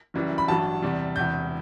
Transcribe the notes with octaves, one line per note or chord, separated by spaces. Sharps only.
F#1 F#2 E3 G3
B5
A1 G2 F#3 A5
E2 C3 G3
E1 E2 C3 G6